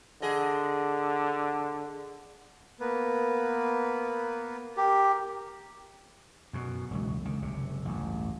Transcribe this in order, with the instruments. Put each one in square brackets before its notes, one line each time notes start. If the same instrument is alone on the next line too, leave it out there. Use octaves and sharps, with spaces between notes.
[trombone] D3 [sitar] G#4 D#5
[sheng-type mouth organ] A#3 B3 B4
[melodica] G4 [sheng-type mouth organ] A#4
[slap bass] F#2 B2
E1 C#2 F#3
C#2 D#3
F#1 C3
A1 D2 G2